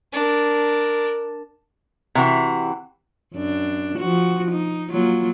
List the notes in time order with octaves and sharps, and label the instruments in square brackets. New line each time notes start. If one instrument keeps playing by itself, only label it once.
[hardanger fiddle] D4 A#4
[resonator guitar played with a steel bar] C3 E3 F#4
[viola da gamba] F#2 D4
F3 F#4
D#4
F#3 A#3 F4